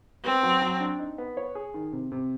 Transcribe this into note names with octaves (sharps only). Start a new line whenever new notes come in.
B3 C4
F#3
F#3
D4
D#4
B3
C#5
G#4
D#3
C3
C3